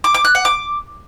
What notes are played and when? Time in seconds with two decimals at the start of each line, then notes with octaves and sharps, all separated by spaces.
0.04 D6
0.14 D6
0.25 F#6
0.35 F#5
0.45 D6